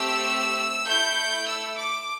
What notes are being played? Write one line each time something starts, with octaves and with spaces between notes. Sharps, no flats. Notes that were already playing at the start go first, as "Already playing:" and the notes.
Already playing: A3 C4 G4 E6
A3 E4 A4 G6
E6
D6